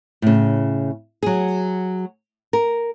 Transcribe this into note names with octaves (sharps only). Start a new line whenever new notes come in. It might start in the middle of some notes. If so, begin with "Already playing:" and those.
A2 C#3
F#3 G#4
A#4